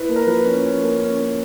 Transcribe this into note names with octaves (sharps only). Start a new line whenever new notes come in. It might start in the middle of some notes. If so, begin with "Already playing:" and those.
Already playing: E4 B4
A#3
A#4
F3 B4
C#4
C#4
A#3
C#4
C#4